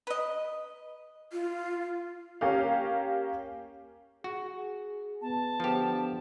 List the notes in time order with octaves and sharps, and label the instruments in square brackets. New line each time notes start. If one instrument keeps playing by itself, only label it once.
[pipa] B4 D#5
[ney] F4
[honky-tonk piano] A#3 C#4 G4 F5
[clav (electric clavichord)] F#4 [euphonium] G#4
[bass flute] B3 [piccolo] A5
[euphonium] D3 [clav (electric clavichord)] F3 G4